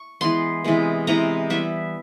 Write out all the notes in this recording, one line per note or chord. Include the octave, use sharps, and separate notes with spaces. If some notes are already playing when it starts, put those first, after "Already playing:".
Already playing: C#6
E3 G#3 B3 C6
C3 E3 G#3 B3
C3 E3 G#3 B3 A#5
E3 G3 B3 E5